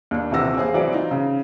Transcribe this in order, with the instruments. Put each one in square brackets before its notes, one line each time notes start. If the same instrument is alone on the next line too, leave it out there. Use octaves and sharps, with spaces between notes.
[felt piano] D#2 D4
D#1 C3 E3 F4 E6 A#6
A#3 G#4 C5 F5 G#5
E3 F#3 C4 D5
D#4 F4
C#3